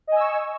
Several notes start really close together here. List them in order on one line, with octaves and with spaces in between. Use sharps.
D#5 G#5 E6 C#6